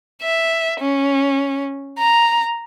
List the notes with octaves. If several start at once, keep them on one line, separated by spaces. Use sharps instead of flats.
E5
C#4
A#5